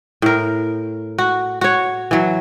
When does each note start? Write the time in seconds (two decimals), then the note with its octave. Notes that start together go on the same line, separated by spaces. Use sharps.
0.22 A2 A#4
1.18 F#4
1.61 F#4 C#5
2.11 E3 F#3